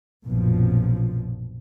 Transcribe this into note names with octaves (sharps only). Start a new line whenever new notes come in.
A#1 F#2 B2 F3